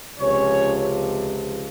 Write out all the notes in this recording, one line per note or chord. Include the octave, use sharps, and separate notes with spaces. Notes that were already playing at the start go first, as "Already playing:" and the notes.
C#2 C3 F3 C#4 C#5